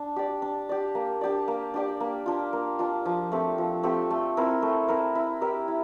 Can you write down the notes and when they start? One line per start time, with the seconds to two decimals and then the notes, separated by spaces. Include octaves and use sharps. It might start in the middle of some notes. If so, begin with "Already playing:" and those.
Already playing: D4
0.16 G4 D5
0.42 D4
0.69 G4 D5
0.95 A#3
1.21 D4 G4 D5
1.48 A#3
1.74 D4 G4 D5
2.00 A#3
2.26 D4 F4
2.53 A#3
2.79 D4 F4
3.05 F3
3.32 A3 C4 G4
3.58 F3
3.83 A3 C4 G4
4.10 A3
4.37 C4 E4 A#4
4.62 A3
4.88 C4 E4 A#4
5.15 E4
5.41 G4 A#4 E5
5.68 E4